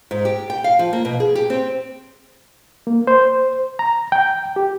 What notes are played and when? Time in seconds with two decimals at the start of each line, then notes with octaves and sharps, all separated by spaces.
0.11 G#2
0.25 G4
0.50 G5
0.64 F5
0.79 F3
0.93 A#3
1.05 B2
1.20 G#4
1.35 G4
1.50 C4
2.87 A#3
3.07 C5
3.79 A#5
4.12 G5
4.56 G4